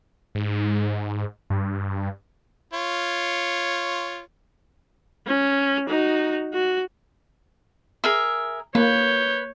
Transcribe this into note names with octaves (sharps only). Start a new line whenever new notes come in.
G#2
G2
F4 C#5
C#4
D#4 F#4
F#4
G#4 A#4 E5
A#3 B4 C#5 G6